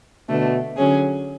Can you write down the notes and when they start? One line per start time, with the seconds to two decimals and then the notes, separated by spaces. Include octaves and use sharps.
0.29 B2 D3 A3 D4
0.77 D3 F#3 C#4 G#4